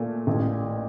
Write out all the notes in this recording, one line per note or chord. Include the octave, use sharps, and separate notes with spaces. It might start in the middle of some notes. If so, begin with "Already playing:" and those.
Already playing: A#2 A3
A1